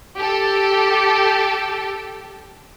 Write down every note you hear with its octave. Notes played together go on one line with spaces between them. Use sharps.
G4 A4